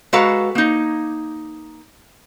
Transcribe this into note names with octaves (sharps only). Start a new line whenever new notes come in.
G#3 F#4 A4 B4 F5 A#5
A#3 D#4